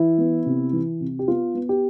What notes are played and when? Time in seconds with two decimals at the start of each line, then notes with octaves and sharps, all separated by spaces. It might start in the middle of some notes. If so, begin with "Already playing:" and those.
Already playing: E3 E4
0.18 B3
0.46 C3
0.73 E3
1.00 C3
1.19 G4
1.28 B3 F4
1.55 B3
1.69 G4